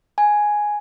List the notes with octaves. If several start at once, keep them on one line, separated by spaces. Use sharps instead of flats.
G#5